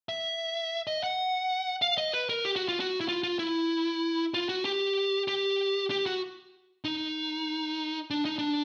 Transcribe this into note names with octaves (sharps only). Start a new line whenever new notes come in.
E5
D#5
F#5
F5
D#5
B4
A#4
G4
F#4
F4
F#4
E4
F4
F4
E4
F4
F#4
G4
G4
G4
F#4
D#4
D4
D#4
D4